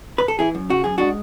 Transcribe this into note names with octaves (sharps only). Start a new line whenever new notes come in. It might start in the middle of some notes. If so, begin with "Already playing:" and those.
B4
A4
E3 E4 G#4
F#2
C#3 F#4
F#2 G#4
G#3 D4 F#4